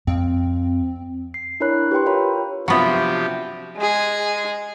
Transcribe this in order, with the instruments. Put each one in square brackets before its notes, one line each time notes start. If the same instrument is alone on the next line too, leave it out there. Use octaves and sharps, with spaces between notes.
[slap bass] F2 [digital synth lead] C4
[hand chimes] C7
D4 E4 A#4 C#5 B5 F#6
G4 B4 G5 C6
F4 A#4 C#5 G5 B5
[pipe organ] C3 F3 G4 [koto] F#3 B3 [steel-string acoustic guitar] D4 F4 E5
[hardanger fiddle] G#3 G#4